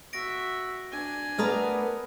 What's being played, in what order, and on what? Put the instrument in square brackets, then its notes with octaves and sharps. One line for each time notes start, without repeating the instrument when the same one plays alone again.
[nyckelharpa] F#4 E5 [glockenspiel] A#6 D7
[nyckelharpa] D4 G#5
[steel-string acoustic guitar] A3 A#4 D5 [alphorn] B3 [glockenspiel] B5 D#6 F6